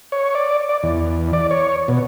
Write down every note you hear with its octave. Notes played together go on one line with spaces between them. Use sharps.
C#5
D5
D5
E2
D5
C#5
B2